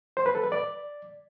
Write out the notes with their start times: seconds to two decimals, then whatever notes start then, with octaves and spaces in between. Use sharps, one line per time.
0.17 C5
0.26 B4
0.35 A4
0.43 B4
0.52 D5